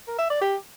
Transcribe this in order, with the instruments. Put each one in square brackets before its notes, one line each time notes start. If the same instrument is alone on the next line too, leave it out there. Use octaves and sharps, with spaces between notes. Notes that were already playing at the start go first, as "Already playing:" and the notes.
[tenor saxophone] A#4
E5
D5
G4